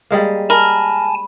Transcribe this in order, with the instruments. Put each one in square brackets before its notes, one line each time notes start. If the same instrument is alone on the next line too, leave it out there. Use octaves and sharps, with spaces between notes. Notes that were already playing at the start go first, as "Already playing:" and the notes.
[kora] G3 G#3 A#3
[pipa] A#4 [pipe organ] G#5 A5 [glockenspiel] B5